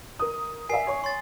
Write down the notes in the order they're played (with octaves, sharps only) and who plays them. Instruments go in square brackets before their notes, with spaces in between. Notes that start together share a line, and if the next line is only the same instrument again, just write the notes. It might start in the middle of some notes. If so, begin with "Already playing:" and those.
[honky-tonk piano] A#4 D#6
[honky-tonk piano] A#4 D5 E5 [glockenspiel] G#5 C7
[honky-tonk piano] C#5 C#6
[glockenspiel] C6 A6